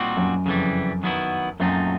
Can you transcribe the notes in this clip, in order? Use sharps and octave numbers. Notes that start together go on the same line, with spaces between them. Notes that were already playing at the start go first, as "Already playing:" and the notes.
Already playing: A#2 G3 C4 D#4 F#4
F#2
F2 C#3 E3 G3
D#3 F#3 B3 E4
F#2 A#2 F#3 A3 C4 D#4